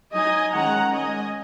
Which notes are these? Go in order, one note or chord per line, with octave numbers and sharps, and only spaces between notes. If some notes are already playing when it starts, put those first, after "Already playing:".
F#3 D#4 D#5 G#5
D#3 G#3 C#4 F#5 A#5
G#3 C#4 D#5 G#5